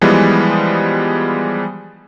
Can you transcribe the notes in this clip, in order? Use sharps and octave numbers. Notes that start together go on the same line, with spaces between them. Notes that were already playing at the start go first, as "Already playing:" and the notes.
E3 F3 G3 G#3 B3